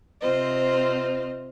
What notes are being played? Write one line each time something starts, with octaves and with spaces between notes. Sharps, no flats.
C3 C4 F4 C5 D#5